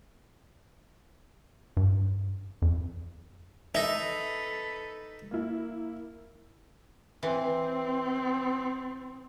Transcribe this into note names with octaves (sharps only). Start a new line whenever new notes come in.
G2
F2
D#4 A4 B4 E5
A#3 E4
E3 C4